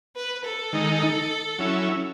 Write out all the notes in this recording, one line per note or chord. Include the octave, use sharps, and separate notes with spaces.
B4
A4
D#3 G#3 D#4
F#3 C#4 E4